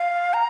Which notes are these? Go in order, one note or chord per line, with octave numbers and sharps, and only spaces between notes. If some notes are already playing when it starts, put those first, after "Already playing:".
Already playing: F5
A#5